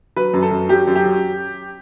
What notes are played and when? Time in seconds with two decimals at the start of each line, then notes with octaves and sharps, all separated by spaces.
0.16 F#3 B4
0.34 F#2
0.43 A4
0.51 F#2
0.69 F#3 G4
0.87 F#2
0.95 G4
1.05 F#3